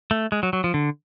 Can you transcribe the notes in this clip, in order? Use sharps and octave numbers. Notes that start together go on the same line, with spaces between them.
A3
G#3
F#3
F#3
F3
D3